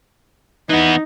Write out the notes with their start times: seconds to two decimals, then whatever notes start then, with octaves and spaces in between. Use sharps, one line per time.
0.69 E3 B3 D#4